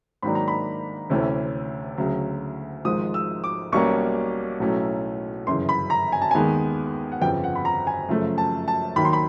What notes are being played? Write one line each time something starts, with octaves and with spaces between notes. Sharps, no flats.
G#2 D#3 F#3 A#3 D4 B5
A#5
B5
D2 C3 E3 A3 C#4
D2 C#3 F#3
G#1 G#2 F3 G#3 D#6
E6
D6
B1 B2 G3 A#3 C#4 C#6
B1 A2 F#3 A3 C#4
G1 F#2 C#3 E3 C6
B5
A#5
G#5
A5
D#2 D#3 G#3 B3 G#5
F#5
G1 F2 C#3 F3 G5
F#5
B5
A#5
G#5
F#2 C#3 F3 A3
A5
A5
D#2 D#3 F#3 B5
C6
B5